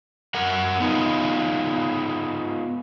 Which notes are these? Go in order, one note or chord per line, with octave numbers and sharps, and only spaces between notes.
F#2 A#4 F#5
B3 D#4 F4